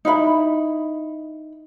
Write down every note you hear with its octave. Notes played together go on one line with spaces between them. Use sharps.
D#4 E4 F5 B5